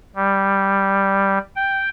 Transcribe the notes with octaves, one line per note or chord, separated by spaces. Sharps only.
G3
G5